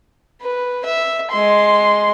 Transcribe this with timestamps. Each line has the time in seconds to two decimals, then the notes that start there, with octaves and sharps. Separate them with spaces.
0.42 B4
0.85 E5
1.31 G#3 C6